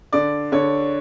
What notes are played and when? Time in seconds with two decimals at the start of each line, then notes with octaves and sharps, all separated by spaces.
0.13 D3 D5
0.52 D3 C#5